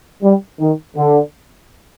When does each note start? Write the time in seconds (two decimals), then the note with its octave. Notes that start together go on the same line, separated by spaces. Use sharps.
0.22 G3
0.60 D#3
0.96 D3